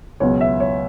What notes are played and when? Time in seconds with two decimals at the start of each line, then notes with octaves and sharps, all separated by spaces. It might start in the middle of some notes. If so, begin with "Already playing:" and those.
0.20 C#2 B2 F#3 B3 C#5
0.41 E5
0.60 C#5